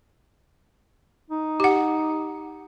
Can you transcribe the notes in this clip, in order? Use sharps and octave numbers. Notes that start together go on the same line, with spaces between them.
D#4
G4 F#5